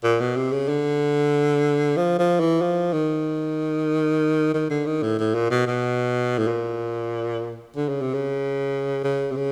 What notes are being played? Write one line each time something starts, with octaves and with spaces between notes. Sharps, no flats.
A#2
B2
C3
C#3
D3
F3
F3
E3
F3
D#3
D#3
D3
D#3
A2
A2
A#2
B2
B2
A2
A#2
D3
C#3
C3
C#3
C#3
C3
C#3